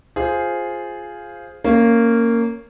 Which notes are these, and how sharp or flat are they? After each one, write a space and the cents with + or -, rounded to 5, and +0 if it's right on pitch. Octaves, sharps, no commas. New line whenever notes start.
F4 +0 G#4 +0 C5 +0
A#3 -15 C#4 +0